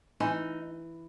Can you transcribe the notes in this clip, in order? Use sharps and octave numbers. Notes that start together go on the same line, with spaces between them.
E3 D#4